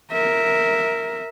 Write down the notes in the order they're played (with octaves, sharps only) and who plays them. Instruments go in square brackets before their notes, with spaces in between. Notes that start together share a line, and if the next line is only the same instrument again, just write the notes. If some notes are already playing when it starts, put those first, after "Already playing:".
[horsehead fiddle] A#4 E5